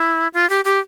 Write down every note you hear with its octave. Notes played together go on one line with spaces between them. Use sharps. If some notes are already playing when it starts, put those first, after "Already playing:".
Already playing: E4
F4
G4
G4